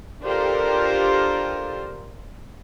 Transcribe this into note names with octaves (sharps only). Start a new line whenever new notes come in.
D4 F4 G4 A4 A#4 C5